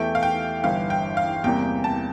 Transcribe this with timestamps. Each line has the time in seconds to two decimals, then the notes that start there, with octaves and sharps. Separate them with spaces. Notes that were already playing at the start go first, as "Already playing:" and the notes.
Already playing: E2 E3 A3 E4 G4 G5
0.15 F5
0.23 G5
0.63 G1 G2 E3 F5
0.90 G5
1.17 F5
1.44 E2 C3 G3 A#3 G5
1.84 A5